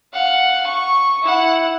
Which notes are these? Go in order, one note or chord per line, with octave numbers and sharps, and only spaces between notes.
F5 F#5
C#6
E4 F#5